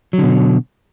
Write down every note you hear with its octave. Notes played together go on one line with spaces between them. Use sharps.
B2 D3 F#3